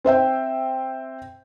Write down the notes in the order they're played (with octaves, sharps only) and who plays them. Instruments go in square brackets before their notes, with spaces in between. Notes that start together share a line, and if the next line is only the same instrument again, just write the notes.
[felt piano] C4 C5 E5 G5